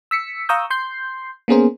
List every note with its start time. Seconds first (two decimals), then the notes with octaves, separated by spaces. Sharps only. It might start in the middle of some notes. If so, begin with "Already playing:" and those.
0.11 E6 B6 C#7
0.49 F5 A#5 C#6 D#6 E6 G6
0.70 C6 G6 C7
1.48 A#3 B3 C#4 G#4 A#4 C5